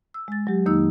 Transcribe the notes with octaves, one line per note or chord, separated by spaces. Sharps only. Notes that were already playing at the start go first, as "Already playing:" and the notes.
E6
G#3 A6
F#3 G4
F2 D#3 A#3 D#4 E6